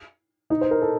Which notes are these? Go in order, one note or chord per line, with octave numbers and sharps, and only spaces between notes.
D#4
C5
A#4
A4